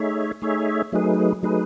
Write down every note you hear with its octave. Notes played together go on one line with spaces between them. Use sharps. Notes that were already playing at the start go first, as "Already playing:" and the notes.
Already playing: A3 D#4 G#4 C#5 E5
A3 D#4 G#4 C#5 E5
F#3 A3 D#4 G#4 B4
F#3 A3 D#4 G#4 B4